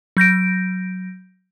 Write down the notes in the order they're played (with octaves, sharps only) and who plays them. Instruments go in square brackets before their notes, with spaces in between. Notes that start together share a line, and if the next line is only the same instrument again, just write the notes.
[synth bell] F#3 G6 A#6 D7